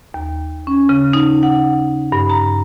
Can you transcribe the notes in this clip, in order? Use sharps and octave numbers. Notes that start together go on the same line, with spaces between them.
D#2
C#4
C#3
D#4
F#5
G2
A#5